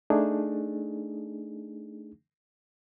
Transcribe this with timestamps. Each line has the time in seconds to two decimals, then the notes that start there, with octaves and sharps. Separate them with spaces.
0.10 A3 D4 D#4 G#4